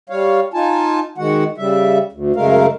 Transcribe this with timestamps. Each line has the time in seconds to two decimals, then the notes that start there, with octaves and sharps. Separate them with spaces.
0.10 G3 C#5 F5
0.54 D#4 F4 G#5 A5
1.18 D#3 G#3 F#4 F#5
1.58 C#3 G3 E5
2.12 D2
2.36 F#2 C#3 G#3 A3 A#4 F5